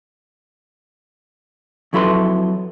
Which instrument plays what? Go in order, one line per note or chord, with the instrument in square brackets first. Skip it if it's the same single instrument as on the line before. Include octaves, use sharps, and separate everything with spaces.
[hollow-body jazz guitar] F2 F#3 E4 A4 B4 C6